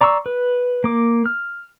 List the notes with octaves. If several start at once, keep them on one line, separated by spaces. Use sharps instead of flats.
D5 A#5 C6 C#6 E6
B4
A#3 D6
F6